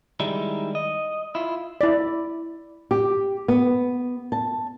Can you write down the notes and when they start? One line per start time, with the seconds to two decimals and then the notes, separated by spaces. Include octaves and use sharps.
0.20 D#3 G3 G#3 D#4 E4
0.75 D#5
1.35 E4 F4
1.81 E4 D5
2.91 G4
3.48 B3
4.32 A5